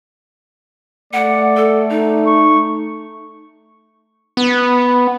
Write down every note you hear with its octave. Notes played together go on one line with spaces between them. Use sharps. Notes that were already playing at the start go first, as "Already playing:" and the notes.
A3 D5 F#5
A4
D#4
C#6
B3